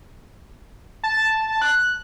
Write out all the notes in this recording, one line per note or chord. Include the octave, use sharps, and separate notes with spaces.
A5
F#6